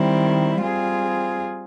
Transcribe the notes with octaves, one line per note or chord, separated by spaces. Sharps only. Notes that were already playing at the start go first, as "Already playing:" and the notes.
Already playing: D#3 G3 C4 E4
G3 C4 F4 G#4